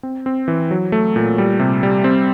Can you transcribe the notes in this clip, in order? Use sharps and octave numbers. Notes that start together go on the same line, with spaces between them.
C4
C4
E3
F#3
A3
A#2
G3
C3
G3
C4